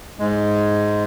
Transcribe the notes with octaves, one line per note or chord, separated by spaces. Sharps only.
G#2 G#3